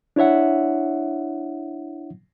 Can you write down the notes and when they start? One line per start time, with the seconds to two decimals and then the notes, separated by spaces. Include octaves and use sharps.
0.16 D4 E4 C#5 E5 F#5